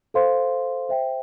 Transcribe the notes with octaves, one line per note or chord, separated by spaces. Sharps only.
A4 C5 F5 C6
C5 E5 G5